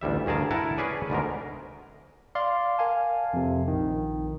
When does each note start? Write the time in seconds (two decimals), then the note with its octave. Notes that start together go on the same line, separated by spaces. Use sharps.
0.01 A1 D2 G3 E5
0.26 D2 G2 G#4 A#4 A5
0.51 E4 A#4 F#5 A5
0.78 C#4 G#4 B4 D5 G#5
1.10 D2 G#2 B2 A#4
2.35 D5 F5 C6
2.78 A#4 F5 G#5 A5
3.33 F2 C3
3.68 A#1 D#3